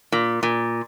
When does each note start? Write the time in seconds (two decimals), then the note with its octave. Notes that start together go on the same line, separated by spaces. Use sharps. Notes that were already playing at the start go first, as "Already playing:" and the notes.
0.12 A#2
0.43 A#2